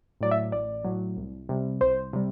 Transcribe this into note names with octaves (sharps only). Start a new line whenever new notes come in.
A2 F#3 D5
E5
A1 D5
A2 F#3
C2
C3 G3
C2 C5
C3 G3